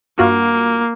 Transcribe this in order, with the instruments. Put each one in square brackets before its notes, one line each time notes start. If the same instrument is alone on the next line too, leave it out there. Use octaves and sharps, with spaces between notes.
[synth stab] G2 F4 F#4 [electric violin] A#3